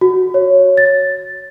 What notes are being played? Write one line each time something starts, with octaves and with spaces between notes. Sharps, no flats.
F#4
C#5
A6